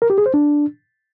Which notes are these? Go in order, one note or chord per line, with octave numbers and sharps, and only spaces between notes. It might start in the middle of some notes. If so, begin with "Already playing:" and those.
A#4
G4
G#4
C5
D4